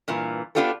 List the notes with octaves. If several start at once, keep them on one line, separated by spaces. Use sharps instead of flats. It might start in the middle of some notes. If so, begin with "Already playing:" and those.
G2 A#2 E3
B3 C4 D4 F4 G4 A4